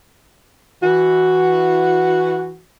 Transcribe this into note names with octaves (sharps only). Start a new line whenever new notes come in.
E3 F#4